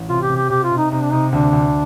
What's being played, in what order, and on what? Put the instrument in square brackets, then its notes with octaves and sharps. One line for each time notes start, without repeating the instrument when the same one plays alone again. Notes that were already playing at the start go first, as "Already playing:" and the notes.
Already playing: [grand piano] A1
[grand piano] C3 [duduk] F4
[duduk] G4
[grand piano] C3
[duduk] G4
[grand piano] C3 [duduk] G4
[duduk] F4
[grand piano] C3
[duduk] D#4
[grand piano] C3 [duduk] D#4
[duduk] D4
[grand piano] C3 [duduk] D#4
[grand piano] D2 [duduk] D4
[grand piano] D2